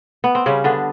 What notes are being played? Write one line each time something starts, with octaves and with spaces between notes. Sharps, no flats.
B3
C4
C#3 G3 C#4
D3 B3 D4